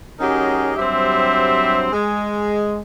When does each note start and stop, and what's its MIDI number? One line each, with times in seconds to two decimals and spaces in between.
0.20 0.73 54
0.20 0.73 61
0.20 0.73 63
0.20 0.73 67
0.20 0.73 68
0.20 0.73 70
0.77 1.88 43
0.77 1.88 54
0.77 1.88 55
0.77 1.88 60
0.77 1.88 72
0.77 1.88 76
1.92 2.80 56